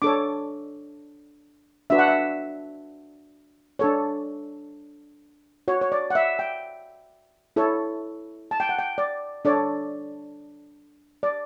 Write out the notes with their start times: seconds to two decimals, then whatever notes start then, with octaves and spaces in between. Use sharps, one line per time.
0.02 D4 A4 C#5 D6
1.90 D4 F#4 B4 E5
1.99 F#5
2.08 E5
3.79 D4 A4 C#5
5.68 F#4 C#5
5.81 C#5
5.92 D5
6.10 F#5
6.15 E5
6.39 G5
7.56 E4 A4 C#5
8.51 A5
8.60 G5
8.69 F#5
8.79 G5
8.98 D5
9.45 D4 A4 C#5 D5
11.23 D5